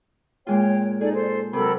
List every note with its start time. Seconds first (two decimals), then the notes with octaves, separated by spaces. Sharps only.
0.47 A#2 G#3 F4 C#5 G5
1.01 D#4 G#4 A4 D5
1.14 A4 C5
1.53 C3 F#3 A4 A#4 B5